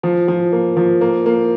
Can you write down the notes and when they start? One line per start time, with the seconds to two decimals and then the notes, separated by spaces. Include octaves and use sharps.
0.03 F3
0.28 F3
0.52 A#3
0.77 F3
1.01 A#3
1.26 A#3